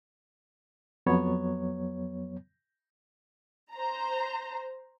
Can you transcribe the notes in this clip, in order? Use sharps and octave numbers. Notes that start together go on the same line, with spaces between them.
F2 F#3 B3 C#5
C5 A#5